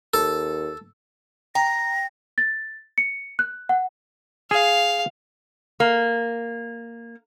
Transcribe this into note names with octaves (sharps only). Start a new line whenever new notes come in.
D#2 A4
G5 A#5 A#6
A6
C#7
F#6
F#5
G#4 F5
A#3